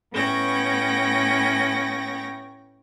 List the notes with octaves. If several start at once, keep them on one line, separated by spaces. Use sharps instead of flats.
A2 B3 C#4 G5 A#6